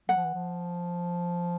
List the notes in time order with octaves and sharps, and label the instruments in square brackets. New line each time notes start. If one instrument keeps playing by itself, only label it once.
[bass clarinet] F#3 [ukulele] F#5
[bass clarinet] F3
E3
F3